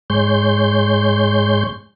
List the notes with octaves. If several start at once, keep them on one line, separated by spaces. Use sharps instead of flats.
G#2 G#3 C#5 C6 G6